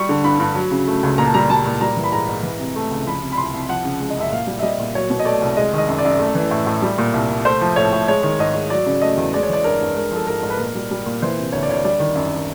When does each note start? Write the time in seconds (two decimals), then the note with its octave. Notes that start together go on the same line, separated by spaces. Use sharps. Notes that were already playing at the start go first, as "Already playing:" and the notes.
Already playing: G3 C#6
0.09 D3
0.24 G2 B5
0.39 G2
0.55 F#3
0.71 C#3
0.88 A3
1.03 C#2
1.18 A#2 A#5
1.26 A5
1.34 G3 A#5
1.50 G3 A5
1.65 A#2
1.81 G3 A#5
1.97 E3
2.04 B5
2.12 G#2 A#5
2.29 G#2
2.43 E3
2.59 C3
2.76 A3
2.91 C#2
3.06 F3 B5
3.22 C3
3.32 B5
3.37 C2 C6
3.54 C2
3.69 F3 F#5
3.84 C#3
4.00 G#3
4.10 D#5
4.17 F#2 E5
4.31 A#2 F5
4.47 G3
4.59 E5
4.63 G3 D#5
4.80 A#2
4.95 F#3 C#5
5.10 B2
5.19 D#5
5.25 A3 D5
5.42 C2
5.57 G#3 D#5
5.73 D#3 D#5
5.88 F#2
5.99 D5
6.05 F#2
6.19 A3
6.35 E3
6.51 A2
6.67 A2
6.82 G3
6.98 A#2
7.14 C2
7.30 C2
7.45 A3 C5
7.61 F3
7.76 A2 C#5
7.92 A2
8.08 G#3 C#5
8.23 D#3
8.39 G#2 D#5
8.55 G#2
8.70 F#3 D5
8.86 C#3
9.02 A3 D#5
9.17 E2
9.33 G#3 D5
9.43 C#5
9.49 E3 D5
9.64 G2 A#4
9.81 G2
9.96 G#3 A#4
10.11 F3 A4
10.27 G#2 A#4
10.43 G#2
10.50 B4
10.58 A#2 A#4
10.75 G3
10.91 G3
11.06 A#2
11.22 E3 C5
11.38 C3
11.52 D2 C#5
11.63 D5
11.69 D2 C#5
11.85 G3 D5
12.00 D#3
12.15 F#2